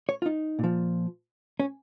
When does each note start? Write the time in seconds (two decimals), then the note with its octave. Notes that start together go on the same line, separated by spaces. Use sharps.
0.09 C#5
0.22 F4
0.26 D#4
0.59 A#2 F3
1.60 C#4